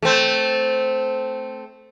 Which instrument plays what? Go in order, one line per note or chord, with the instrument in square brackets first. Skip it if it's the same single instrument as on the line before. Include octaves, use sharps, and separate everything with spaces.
[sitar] A3 C4